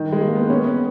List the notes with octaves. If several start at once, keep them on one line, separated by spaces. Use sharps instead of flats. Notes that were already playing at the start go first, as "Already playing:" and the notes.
Already playing: D#3
G#3
A#3
B3
C#4
B3